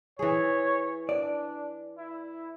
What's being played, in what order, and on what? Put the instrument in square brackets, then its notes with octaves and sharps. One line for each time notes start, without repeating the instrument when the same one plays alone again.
[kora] E3 G#4 [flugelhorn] C#5
[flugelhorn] D4 [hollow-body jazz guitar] D5
[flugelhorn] E4